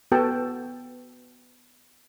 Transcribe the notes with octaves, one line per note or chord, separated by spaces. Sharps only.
B3 F#4 A4 G5 A5